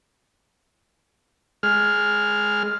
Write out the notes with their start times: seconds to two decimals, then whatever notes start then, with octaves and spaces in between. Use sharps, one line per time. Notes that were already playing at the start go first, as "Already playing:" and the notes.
1.63 G#3 F6